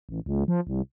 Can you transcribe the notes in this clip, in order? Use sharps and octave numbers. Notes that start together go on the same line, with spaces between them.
A1
C#2
F3
C2